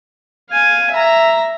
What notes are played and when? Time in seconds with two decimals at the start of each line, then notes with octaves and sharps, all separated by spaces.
0.51 F5 G#5
0.92 E5 A#5